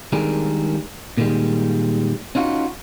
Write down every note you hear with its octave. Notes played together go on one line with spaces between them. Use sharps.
D#3 G3 G#3 D4 G#4 A#4
A#2 D3 D#3 G3 G#3
C#4 D#4 F4 F#4